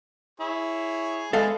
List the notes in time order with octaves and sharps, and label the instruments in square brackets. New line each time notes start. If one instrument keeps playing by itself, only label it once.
[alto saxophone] E4 [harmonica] G#4 C#5
[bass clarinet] G#3 [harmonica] G#4 B4 E5 [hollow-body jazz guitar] A4 F5